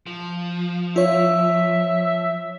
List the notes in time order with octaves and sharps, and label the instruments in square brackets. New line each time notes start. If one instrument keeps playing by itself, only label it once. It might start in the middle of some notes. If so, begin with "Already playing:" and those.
[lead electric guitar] F3
[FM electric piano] F4 C#5 [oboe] E5